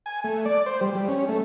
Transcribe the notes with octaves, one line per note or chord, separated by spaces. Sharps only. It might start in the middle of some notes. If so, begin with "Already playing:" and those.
G#5
A3
D5
C5
G3
G3
C#4
A3